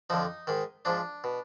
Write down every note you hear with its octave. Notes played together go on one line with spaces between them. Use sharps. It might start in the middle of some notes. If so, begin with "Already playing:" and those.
F2 D3 F3 D#4
G#2 D#3
G#2 F3 D4
B2